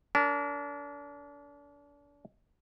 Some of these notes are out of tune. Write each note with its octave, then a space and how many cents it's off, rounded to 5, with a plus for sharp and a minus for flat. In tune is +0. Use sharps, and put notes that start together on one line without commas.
D4 -35 A#4 -15